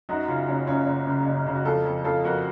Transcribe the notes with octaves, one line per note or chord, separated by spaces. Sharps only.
F#2 D#4 F#4
C#3 C#4 F4
F#1 C#4
F#1 C#4 F4
F#1
C#3
F#1
C#3
F#4
F2 F4 A4
F2
F2 F4 A4
F2 F#4 A#4